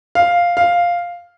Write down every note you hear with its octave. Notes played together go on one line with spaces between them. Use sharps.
F5
F5